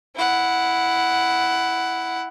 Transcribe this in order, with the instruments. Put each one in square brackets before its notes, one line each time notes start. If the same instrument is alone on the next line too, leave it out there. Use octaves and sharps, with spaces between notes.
[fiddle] E4 F#5